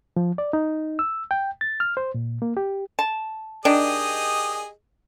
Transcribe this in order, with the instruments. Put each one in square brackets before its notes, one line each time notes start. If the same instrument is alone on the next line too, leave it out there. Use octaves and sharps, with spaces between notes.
[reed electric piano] F3
D5
D#4
E6
G5
A6
F6
C5
A#2
A#3
G4
[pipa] A5
[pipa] D#3 D4 [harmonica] G4 G#4 D#5